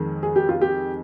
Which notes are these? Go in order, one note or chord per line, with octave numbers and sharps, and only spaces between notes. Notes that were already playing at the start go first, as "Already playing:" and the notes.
Already playing: F2 D#3 G#3
G#4
G4
F4
G4